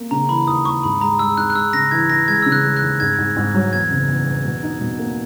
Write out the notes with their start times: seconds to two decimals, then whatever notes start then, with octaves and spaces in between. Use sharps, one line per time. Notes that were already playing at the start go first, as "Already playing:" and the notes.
Already playing: A#3
0.11 C#3 A#5
0.29 E3 B5
0.47 D#2 D#6
0.65 D#2 C#6
0.83 G#2 B5
1.01 G#3 A#5
1.19 G#3 E6
1.37 G#2 F#6
1.50 F#6
1.55 G#3 E6
1.73 C#3 A#6
1.91 E3 G#6
2.10 E3 A#6
2.28 G#3 G#6
2.42 C#3 E6
2.52 F#6
2.64 G#3
2.76 F#6
2.82 D#2
3.00 G#2 G#6
3.18 G#2
3.37 G#2
3.54 F#3
3.73 E2 G#6
3.91 F#1
4.09 E2
4.27 E2
4.45 B2
4.63 D#4
4.81 B2
4.99 A#3